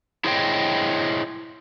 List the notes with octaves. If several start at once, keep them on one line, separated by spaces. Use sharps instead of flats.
E4 G#4 C5 C#5 D#5 G5